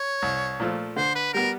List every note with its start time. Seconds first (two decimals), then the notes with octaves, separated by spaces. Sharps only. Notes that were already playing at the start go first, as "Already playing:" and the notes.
Already playing: C#5
0.22 C2
0.60 A#2 F3 A3
0.96 D3 C5
1.15 B4
1.33 G3 B3 A#4